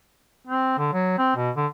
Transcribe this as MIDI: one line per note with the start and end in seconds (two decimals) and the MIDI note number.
0.47 0.77 60
0.78 0.88 50
0.93 1.14 54
1.18 1.36 60
1.36 1.50 47
1.56 1.67 50